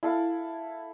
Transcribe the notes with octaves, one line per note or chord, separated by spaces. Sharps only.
E4 A4 F5